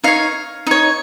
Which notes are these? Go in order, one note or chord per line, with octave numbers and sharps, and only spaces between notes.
D#4 C#5 F5
D#4 C#5